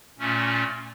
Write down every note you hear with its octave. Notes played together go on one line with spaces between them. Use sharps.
A#2 A3 C#4